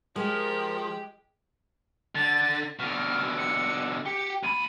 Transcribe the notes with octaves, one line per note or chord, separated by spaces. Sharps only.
F3 G#3 G4 A#4
D3 A6
B2 D3 F6
C#7
G4 C#7
D2 B5 D#7